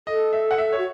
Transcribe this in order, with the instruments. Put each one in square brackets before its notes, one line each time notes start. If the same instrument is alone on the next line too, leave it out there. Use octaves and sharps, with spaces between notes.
[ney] A4 [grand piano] D#5
[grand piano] E5
F#5
E5
C#5
[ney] F#4